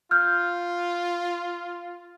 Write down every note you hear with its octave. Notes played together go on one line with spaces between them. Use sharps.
F4 F6 G6